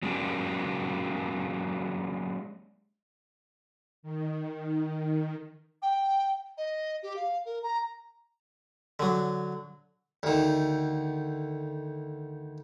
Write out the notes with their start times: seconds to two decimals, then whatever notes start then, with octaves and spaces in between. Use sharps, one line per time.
0.03 F#3 G#3 A#3 C#4 D4 G4
4.03 D#3
5.82 G5
6.58 D#5
7.03 G4
7.16 F5
7.46 A#4
7.63 A#5
8.99 D3 F#3
10.23 D2 D#3